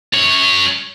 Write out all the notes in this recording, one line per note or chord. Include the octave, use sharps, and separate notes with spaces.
F#2 C#5